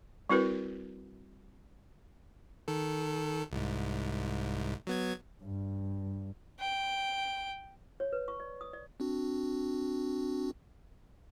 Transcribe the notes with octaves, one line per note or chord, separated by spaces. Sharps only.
G3 C4 E4 F#4 A#4 B4
D#3 A4
C2 G#2
F#3 B3 G#6
G2
G5
C#5
B4
C#6
D5
D#6
D5
C4 D4 F#4